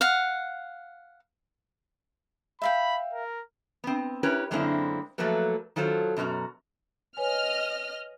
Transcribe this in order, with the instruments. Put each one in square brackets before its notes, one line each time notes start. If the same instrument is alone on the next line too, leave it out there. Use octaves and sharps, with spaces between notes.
[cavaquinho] F5 F#5
[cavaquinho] E5 F5 G5 [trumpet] B5
[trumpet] A#4
[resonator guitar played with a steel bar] B3 C4
C#4 E4 G4 A#4 B4 C#5
F#2 D3 G#3 A#3 C4 E4
F3 F#3 A3 A#3 A4 B4
D#3 F#3 F4 A4 C5
F#2 B2 F4 F#4 A#5
[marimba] B4 C#5 G#5 [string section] D#5 F6